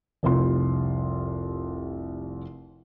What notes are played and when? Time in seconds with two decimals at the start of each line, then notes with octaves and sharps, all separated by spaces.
0.23 F1 C2 F4 C6